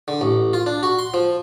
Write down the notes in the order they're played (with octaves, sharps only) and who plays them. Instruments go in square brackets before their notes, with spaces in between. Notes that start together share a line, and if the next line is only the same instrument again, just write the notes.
[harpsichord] D3
A1
F4
D4
F#4
C6
F3